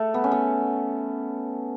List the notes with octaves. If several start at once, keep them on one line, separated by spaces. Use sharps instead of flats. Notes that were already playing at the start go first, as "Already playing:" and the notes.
Already playing: A3
B3
C#4
B3